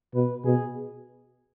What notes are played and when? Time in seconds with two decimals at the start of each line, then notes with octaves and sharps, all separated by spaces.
0.14 B2 B4
0.45 B2 G#4